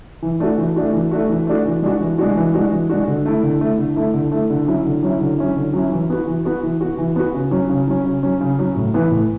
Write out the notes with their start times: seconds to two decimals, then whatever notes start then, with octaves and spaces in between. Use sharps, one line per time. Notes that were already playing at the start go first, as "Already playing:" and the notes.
0.22 E3
0.40 A3 D4 F#4
0.58 E3
0.76 A3 D4 F#4
0.93 E3
1.11 A3 D4 F#4
1.29 E3
1.47 A3 D4 F#4
1.65 E3
1.82 G#3 D4 F#4
2.00 E3
2.18 G#3 D4 F#4
2.36 E3
2.54 G#3 D4 F#4
2.72 E3
2.89 G#3 D4 F#4
3.07 D3
3.25 A3 E4
3.43 D3
3.61 A3 E4
3.78 D3
3.96 A3 E4
4.14 D3
4.31 A3 E4
4.50 D3
4.67 F#3 C#4 E4
4.85 D3
5.03 F#3 C#4 E4
5.21 D3
5.38 F#3 C#4 E4
5.56 D3
5.74 F#3 C#4 E4
5.92 E3
6.10 B3 F#4
6.27 E3
6.45 B3 F#4
6.63 E3
6.81 B3 F#4
6.98 E3
7.16 B3 F#4
7.34 C#3
7.51 F#3 C#4
7.69 C#3
7.88 F#3 C#4
8.05 C#3
8.23 F#3 C#4
8.41 C#3
8.59 F#3 C#4
8.76 A2
8.94 E3 B3
9.11 A2